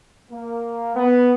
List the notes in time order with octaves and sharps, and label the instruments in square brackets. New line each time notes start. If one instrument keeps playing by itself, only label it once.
[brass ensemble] A#3
B3